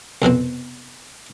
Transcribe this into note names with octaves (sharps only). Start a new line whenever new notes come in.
C2 F2 B2 C4